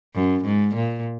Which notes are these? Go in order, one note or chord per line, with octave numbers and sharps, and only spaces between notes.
F#2
G#2
A#2